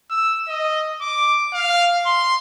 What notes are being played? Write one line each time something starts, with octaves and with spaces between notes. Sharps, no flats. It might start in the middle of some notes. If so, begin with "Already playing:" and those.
E6
D#5
D6
F5
C6